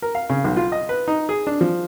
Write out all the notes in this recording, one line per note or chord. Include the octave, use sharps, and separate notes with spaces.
A#4
F5
C#3
B1
F4
D#5
B4
D#4
G#4
D4
F3